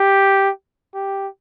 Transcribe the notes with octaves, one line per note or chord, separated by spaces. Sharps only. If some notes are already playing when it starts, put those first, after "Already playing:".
Already playing: G4
G4